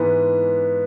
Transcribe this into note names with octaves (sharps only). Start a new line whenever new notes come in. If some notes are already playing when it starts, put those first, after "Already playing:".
Already playing: G#2 E3 G#3 B3